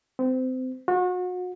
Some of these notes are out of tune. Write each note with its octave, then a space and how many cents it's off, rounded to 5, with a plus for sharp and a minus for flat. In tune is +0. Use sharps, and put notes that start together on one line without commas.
C4 -30
F#4 -35